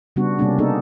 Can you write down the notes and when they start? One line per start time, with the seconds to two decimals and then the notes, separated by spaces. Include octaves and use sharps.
0.16 C#3 G3 B3 D4 F#4
0.39 C3 G3 A#3 C#4 D4
0.58 A#3 B3 D4 D#4 G#4 A4